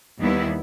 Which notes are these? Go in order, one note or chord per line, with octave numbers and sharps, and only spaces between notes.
D#2 D#3 G3 B3 E4